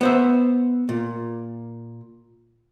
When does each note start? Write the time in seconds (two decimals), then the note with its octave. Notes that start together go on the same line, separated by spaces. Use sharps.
0.01 B3 C5 E5
0.89 A#2